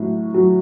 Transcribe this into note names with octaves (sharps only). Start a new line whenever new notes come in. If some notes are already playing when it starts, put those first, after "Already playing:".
Already playing: A2 F#3
F#3